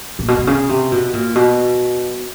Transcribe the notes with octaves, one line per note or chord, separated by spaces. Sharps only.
A#2
B2
C3
C#3
C3
B2
A#2
B2